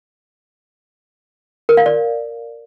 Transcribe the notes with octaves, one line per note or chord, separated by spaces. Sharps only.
A#4
F5
D5